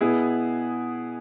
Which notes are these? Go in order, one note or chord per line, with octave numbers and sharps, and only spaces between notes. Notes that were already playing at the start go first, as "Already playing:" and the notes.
B2 B3 E4 G#4